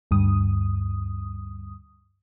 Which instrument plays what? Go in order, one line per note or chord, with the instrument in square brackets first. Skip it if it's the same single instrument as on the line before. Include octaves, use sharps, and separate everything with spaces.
[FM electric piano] D2 G2 D#6